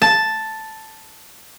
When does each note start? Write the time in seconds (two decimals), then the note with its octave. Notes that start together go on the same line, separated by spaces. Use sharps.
0.02 A5